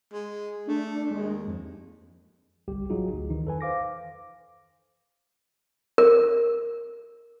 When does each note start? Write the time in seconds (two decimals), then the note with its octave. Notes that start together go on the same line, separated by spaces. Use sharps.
0.13 G#3
0.67 A3 D4
1.11 D#2 G#3
1.47 F2
2.68 G1 C2 G3 G4
2.90 A1 F#3 D#4 F4 F#4 G#4
3.13 D2
3.30 D#3 E3 D#4
3.45 F2 A4 B4 G#5
3.61 C5 F5 D6 A#6
5.98 A#4